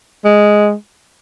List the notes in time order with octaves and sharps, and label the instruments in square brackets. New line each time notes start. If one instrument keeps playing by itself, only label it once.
[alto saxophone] G#3